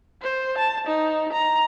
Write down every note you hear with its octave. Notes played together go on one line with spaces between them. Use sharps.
C5
A5
D#4
A#5